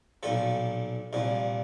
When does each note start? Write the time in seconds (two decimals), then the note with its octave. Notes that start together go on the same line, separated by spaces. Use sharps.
0.23 B1 A#2 F3 A4
1.13 C2 A#2 F3